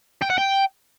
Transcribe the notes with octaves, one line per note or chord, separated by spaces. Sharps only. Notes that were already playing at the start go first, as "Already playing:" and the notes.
G5
F#5
G5